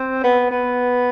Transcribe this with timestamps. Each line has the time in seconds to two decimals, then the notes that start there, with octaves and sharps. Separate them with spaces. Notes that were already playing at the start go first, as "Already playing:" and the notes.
Already playing: C4
0.24 B3
0.51 B3